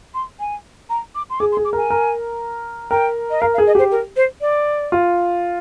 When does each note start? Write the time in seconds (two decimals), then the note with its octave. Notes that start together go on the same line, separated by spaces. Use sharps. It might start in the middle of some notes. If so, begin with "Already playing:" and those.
0.14 C6
0.40 G#5
0.90 A#5
1.15 D6
1.30 C6
1.40 G#4 D6
1.52 C6
1.57 G#4
1.65 D6
1.73 A#4 G#5
1.90 A#4
2.91 A#4 G5
3.30 D#5
3.41 A#4 F5
3.54 F5
3.58 G#4
3.67 D#5
3.75 G4 C5
3.92 A#4
4.16 C5
4.41 D5
4.92 F4